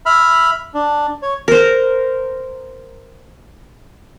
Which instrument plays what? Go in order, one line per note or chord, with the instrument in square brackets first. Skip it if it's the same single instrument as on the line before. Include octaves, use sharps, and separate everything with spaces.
[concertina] E5 B5 F6
D4
C#5
[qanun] A#4 C5